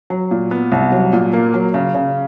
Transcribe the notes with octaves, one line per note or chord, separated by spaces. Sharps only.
F#3
A#2
B3
C2
F#3
A#2
A#3
F#3
C#3
C#3